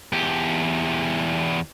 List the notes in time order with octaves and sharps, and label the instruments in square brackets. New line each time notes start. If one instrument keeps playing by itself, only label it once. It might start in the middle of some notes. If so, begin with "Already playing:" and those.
[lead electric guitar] E2 G4